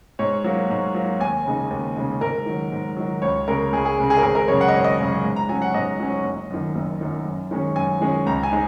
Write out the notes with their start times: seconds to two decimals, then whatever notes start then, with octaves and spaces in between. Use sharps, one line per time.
0.19 G#2 C#5
0.44 F#3 A#3
0.70 G#2
0.95 F#3 A#3
1.20 D#2 G#5
1.45 C#3 G#3 D#4
1.70 D#2
1.96 C#3 G#3 D#4
2.21 G#2 A#4
2.46 D#3 F#3
2.72 G#2
2.97 D#3 F#3
3.22 C#2 C#5
3.48 C#3 G#3 A#4
3.72 C#2 G#4
3.85 G#4
3.98 C#3 G#3
4.10 G#4
4.17 A#4
4.23 G#1 G#4
4.35 A#4
4.48 F#2 C#3 G#3 C#5
4.61 F#5
4.68 D#5
4.73 G#1 C#5
4.84 D#5
4.99 F#2 C#3 G#3
5.24 G#2
5.36 A#5
5.49 F#3 C#4 G#5
5.62 F#5
5.74 G#2 D#5
6.00 F#3 C#4
6.24 F#1
6.50 F#2 D#3
6.75 F#1
7.01 F#2 D#3
7.25 F#2
7.51 D#3 G#3 C#4
7.76 F#2 G#5
8.01 D#3 G#3 C#4
8.26 C#2 A#5
8.43 G#5
8.52 G#3 D#4